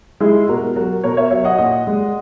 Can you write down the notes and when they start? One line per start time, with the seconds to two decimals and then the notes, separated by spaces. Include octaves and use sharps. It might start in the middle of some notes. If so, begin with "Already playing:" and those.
0.20 G#3 E4 G#4
0.48 B2 F#4 A#4
0.75 F#3 F#4 A#4
1.04 B2 A#4 C#5
1.17 C#5 E5
1.31 F#3 C#5 E5
1.44 D#5 F#5
1.58 A#2 D#5 F#5
1.87 G#3